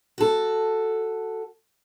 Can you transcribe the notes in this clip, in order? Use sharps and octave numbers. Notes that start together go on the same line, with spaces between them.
F#4 A4